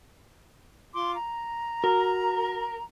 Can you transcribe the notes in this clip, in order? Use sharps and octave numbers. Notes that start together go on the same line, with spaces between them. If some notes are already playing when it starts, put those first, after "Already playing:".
F4 C6 D6
A#5
F#4 A#4